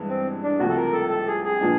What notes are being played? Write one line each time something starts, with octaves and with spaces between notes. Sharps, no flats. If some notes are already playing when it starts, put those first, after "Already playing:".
Already playing: G2 E3 G#3 B3 E4
C4
D4
C#2 C3 F3 A3 F#4
A4
A#4
A4
A4
G#4
G#4
A#2 F3 G#3 B3 D4